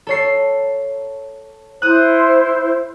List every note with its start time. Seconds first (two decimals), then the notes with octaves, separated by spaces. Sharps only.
0.07 A4 C#5 C7
1.82 E4 C5 D#6 F#6